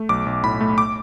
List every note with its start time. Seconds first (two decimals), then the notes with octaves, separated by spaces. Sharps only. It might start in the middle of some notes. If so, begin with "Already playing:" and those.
Already playing: A3
0.09 B1 D6
0.26 B1
0.43 A2 B5
0.60 A3
0.78 D6